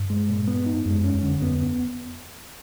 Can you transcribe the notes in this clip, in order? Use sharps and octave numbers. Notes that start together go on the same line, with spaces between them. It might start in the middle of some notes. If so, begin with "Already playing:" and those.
Already playing: G2
G#3
A#2
B3
D#4
F#2 G#3
C#4
F2
D3
F2 B3